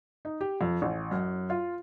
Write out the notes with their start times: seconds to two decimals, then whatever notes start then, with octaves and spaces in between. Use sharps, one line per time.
0.25 D#4
0.41 G4
0.61 F2
0.82 A1
1.11 F#2
1.50 F4